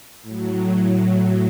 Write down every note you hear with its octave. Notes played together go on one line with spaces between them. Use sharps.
A2 F#3